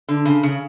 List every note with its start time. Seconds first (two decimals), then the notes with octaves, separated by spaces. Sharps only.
0.09 D3
0.25 C#3
0.43 C#3